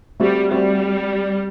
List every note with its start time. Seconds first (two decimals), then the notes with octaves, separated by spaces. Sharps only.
0.20 G3 A3 C4 F#4 C5 E5
0.51 G3 A3 C4 F#4 C5 E5